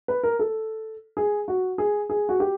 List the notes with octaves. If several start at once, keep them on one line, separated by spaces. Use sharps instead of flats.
B4
A#4
A4
G#4
F#4
G#4
G#4
F#4
G4